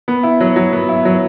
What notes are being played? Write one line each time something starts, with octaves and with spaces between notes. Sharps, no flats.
B3
E4
F#3
F#3
B3
E4
F#3